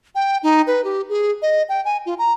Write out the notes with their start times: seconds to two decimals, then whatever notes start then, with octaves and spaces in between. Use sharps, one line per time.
0.15 G5
0.43 D#4
0.67 B4
0.84 G4
1.09 G#4
1.42 D#5
1.69 G5
1.85 G#5
2.06 F4
2.19 A#5